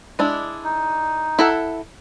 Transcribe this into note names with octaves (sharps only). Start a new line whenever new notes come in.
G#3 D4 E4
D#4
E4 A4 F#5